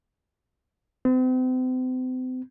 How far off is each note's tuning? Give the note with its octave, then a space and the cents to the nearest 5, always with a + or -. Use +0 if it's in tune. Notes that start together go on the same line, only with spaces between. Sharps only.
C4 -40